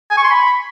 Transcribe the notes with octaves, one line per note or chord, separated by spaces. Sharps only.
G#5
C#6
C6
B5